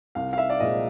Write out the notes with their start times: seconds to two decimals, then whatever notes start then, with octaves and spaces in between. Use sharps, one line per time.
0.15 C2 F5
0.33 F5
0.38 E5
0.50 D5
0.60 A#2 F3 G#3 D#5